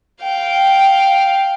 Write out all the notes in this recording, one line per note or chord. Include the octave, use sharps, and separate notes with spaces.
F5 G5